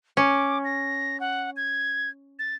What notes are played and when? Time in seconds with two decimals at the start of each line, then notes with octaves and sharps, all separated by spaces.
0.17 C#4 D6
0.64 A#6
1.20 F#5
1.56 G#6
2.39 A6